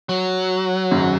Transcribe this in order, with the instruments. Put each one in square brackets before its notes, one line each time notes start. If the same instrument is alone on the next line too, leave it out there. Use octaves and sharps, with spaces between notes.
[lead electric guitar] F#3
[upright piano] G#1 F#2 C#3